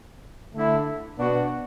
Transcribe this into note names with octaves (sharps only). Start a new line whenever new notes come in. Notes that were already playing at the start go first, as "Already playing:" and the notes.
D3 A3 E4
B2 B3 D4 F#4